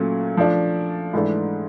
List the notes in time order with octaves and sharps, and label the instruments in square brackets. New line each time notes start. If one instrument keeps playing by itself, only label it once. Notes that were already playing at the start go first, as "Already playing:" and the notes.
Already playing: [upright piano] A#2 F#3 A3 C#4
F3 A3 D4
G#2 E3 A3 D4